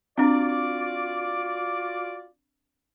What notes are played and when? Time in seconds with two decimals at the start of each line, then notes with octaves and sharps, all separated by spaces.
0.18 C4 D4 F4 F#4 D5